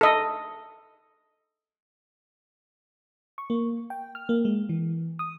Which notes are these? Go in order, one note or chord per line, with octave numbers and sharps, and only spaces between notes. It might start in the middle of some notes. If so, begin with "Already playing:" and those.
A4 D#5
C#6
A#3
G5
F6
A#3
G#3
E3
D#6